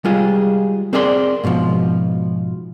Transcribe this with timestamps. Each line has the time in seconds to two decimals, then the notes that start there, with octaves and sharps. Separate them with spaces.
0.05 G3 G#3 F4 G#4
0.93 C4 G#4 A#4 D5 F#5 C6
1.44 G#2 B2 E3 F3